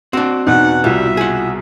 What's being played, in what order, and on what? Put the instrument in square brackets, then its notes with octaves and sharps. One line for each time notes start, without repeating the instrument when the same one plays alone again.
[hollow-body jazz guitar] C4 D4 [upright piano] F#4
[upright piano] E2 B2 [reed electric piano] D#4 [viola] F#5
[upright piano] C2 B2 [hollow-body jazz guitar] G3 [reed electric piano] E4 F4 [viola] E5
[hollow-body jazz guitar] G#4 F#5